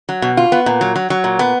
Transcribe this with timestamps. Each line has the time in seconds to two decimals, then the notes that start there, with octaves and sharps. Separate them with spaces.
0.09 F#3
0.22 B2
0.37 F4
0.52 B3
0.66 A#2
0.81 F#3
0.96 F#3
1.10 F#3
1.24 A#2
1.39 B3